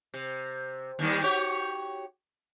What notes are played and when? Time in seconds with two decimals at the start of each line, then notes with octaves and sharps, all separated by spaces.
0.14 C3
0.99 D#2 D#3 G3
1.24 F#4 G4 C#5